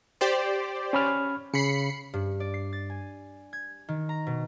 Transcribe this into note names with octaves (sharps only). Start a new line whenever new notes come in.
G4 C5 D5
C#4 B5 F6
C#3 B5 C7 C#7
G2
D5
C7
A6
G#5
G#6
D#3
A#5
B2